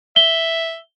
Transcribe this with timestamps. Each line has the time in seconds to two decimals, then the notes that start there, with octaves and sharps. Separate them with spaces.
0.16 E5 G7